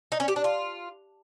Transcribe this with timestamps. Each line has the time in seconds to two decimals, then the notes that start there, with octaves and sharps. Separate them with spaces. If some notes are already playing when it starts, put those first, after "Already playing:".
0.12 D#4
0.20 C#4
0.28 G4
0.36 D4
0.44 F4